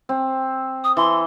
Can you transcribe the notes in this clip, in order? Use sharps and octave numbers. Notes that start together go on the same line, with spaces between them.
C4
D#6
E3 C6